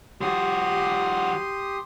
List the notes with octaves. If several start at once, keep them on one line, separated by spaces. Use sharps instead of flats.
F3 F#4 G4 C6 D#6